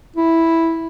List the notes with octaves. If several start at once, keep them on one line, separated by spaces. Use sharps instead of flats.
E4